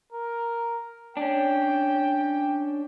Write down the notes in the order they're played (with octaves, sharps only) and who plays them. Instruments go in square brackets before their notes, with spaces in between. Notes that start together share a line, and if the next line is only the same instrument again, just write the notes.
[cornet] A#4
[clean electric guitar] C#4 D4 [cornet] G5